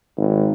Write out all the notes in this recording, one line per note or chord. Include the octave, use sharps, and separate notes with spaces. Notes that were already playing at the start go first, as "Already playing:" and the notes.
G#1